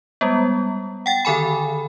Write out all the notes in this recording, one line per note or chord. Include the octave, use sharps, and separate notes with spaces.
G3 G#3 B3
F#5 G5 A6
D3 D#3 A4 G#5 B5